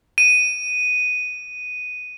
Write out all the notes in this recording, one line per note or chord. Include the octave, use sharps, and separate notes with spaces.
D#7